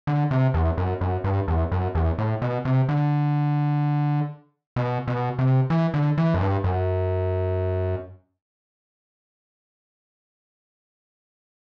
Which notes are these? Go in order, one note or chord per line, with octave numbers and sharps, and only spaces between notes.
D3
C3
E2
F#2
F#2
G2
E2
F#2
E2
A2
B2
C3
D3
B2
B2
C3
E3
D3
E3
F#2
G2
F#2